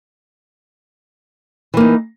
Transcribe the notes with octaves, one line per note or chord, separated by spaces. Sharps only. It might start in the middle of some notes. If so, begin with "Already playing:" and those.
E3 A#3 D#4